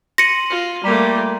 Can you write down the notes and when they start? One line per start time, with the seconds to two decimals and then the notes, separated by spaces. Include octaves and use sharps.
0.18 C6 A#6 C#7 D#7 F#7
0.50 F4
0.84 G3 A3 A#3 A#5